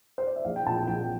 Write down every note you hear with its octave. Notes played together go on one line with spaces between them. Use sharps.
C5
D5
E5
A#1 F5
G5
A#2 A5
G5
A#1 G5